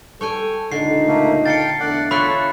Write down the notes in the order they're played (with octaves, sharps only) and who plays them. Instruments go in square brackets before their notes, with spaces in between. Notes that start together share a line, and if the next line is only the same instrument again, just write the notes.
[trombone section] G3 A4 [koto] C#5 G5 G#5
[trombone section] C#2 A#2 D#4 [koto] D3 [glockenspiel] C7
[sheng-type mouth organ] A3 A#3
[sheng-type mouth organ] F5 G5 A5 [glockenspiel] A6 C7 C#7
[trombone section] E2 A3 D4 [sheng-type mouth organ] D5 F#5
[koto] F4 A4 E5 [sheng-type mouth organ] C#5 [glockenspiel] B5 F#6